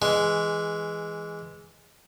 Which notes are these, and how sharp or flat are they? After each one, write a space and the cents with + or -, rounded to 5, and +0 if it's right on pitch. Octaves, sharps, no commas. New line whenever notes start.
E3 +0 G#3 +0